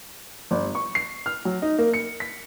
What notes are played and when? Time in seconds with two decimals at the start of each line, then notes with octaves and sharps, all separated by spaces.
0.51 G1
0.75 C#6
0.95 C7
1.26 F6
1.45 F#3
1.62 D#4
1.78 A#3
1.94 C#7
2.20 B6